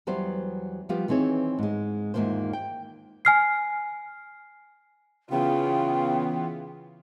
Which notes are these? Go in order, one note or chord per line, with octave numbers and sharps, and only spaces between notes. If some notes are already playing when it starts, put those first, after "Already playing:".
E2 F#3 G3 B3 C5
F3 G3 B3 F4 G4
D#3 E3 C4 G#4 C#5
G#2 G#3
E2 G#2 D#3 A#3 F4 C5
G5
G#5 F6 C7
C#3 E3 B3 F4 G5